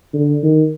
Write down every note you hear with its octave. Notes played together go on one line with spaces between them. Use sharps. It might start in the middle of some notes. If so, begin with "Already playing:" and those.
D3
D#3